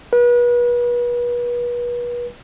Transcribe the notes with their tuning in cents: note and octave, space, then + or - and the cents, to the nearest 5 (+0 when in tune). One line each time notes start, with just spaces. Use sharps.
B4 -35